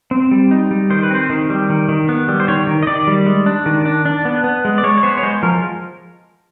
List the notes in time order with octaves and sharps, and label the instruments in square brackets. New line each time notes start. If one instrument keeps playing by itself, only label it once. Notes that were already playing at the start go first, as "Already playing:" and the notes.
[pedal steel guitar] C4
G3
D#4
G3
D#3 C5
B4
C4 C5
D#3
G3
D#3
D#3
B3
G3
C5
D#3 C#5
D#3
D#5
D#3 D5
G3
G#3
D4
D#3
D4
D4
B3
B3
G#3
D5
G#3 C#5
C#5
B3 C5
C#5
G#3 C5
F3 A#4